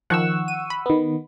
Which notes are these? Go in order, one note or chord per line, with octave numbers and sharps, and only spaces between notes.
D#3 F3 F#5 C#6 E6
D#7
B5
D#3 B3